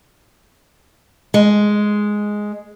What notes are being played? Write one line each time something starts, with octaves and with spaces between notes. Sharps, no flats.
G#3